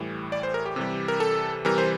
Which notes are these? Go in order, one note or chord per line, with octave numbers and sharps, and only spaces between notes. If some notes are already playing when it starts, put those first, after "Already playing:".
Already playing: A2 E3 G3
D5
C5
A#4
G4
C3 E3 G3
A#4
A4
C3 E3 G3 A#4
C5